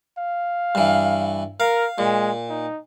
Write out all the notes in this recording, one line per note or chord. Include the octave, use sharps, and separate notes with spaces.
F5
G2 E3
A#4 F5
A#2 G#3
D#4